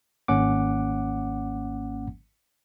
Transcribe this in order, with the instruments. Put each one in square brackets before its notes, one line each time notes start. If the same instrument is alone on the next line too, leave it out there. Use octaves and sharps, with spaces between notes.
[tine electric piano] G#1 A#3 C#4 F#5 D6